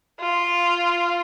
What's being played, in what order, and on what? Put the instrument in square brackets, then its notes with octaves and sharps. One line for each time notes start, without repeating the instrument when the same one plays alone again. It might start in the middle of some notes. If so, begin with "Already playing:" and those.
[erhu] F4